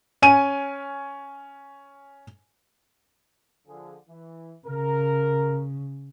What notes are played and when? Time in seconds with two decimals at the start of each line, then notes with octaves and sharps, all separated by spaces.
0.22 C#4 G#5 D#7
3.67 D3 F3 G#4
4.09 E3
4.67 C#3 A#4